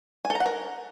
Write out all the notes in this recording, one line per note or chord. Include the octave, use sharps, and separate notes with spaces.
G#5
A4
A#5
F#5
A#4